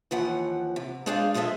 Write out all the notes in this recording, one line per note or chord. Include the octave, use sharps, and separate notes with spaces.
D#2 E3 F3 F#5
C3
G#3 D4 G#4 C5 D5 F5
F3 G#3 G#4 A4 E5